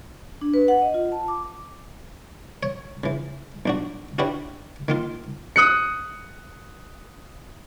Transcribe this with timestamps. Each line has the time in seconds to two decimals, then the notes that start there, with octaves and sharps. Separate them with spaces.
0.41 D4
0.54 B4
0.68 F#5
0.82 D#5
0.94 F4
1.12 A5
1.28 D6
2.63 C#5
3.04 C#3 E3
3.66 B1 D4 F#4
4.18 C#4 D4 E4 F#4 G4 B4
4.88 D#3 A#3 F4
5.56 D#6 F#6 C#7